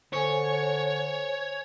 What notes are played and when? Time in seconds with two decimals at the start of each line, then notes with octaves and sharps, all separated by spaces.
0.13 D3 C5 C#5 G#5